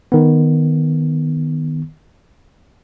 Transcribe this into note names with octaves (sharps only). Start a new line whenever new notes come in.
D#3 B3